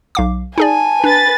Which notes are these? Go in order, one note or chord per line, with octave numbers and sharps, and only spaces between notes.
B1 F5 D6
D#4 G#4 D5 G#5 A5
D4 B4 A6